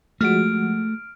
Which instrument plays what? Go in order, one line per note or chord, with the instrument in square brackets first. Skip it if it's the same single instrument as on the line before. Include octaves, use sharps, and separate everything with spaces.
[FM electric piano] F3 G#3 F#4 [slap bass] A3 [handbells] F6 D7